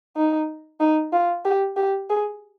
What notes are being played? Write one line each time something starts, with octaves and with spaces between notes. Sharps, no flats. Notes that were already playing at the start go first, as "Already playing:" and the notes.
D#4
D#4
F4
G4
G4
G#4